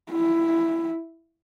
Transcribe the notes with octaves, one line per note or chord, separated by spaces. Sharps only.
E4